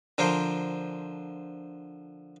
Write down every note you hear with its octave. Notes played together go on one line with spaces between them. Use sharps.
D3 F3 A#4 C5